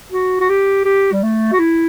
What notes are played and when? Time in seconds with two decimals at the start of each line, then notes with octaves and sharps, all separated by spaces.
0.12 F#4
0.40 F#4
0.49 G4
0.85 G4
1.12 G3
1.23 A3
1.53 F#4
1.59 E4